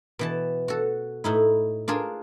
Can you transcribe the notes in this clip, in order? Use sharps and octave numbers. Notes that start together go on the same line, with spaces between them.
B2 E3 A5
F#4 A4
A2 D#4 E4
D4 F4 G#4 A#4